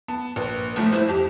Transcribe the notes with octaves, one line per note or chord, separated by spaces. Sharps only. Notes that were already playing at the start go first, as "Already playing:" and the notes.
B3 A5
A#1 B4
G1 F3 A3
E4 C5
F2 G4